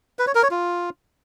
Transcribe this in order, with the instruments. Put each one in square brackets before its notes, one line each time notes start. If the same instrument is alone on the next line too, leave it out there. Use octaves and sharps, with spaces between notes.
[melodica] B4
C#5
A#4
C#5
F4